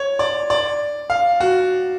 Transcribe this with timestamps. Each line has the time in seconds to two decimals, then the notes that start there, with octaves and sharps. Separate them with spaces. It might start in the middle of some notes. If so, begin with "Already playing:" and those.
Already playing: C#5
0.19 D5
0.50 D5
1.10 F5
1.40 F#4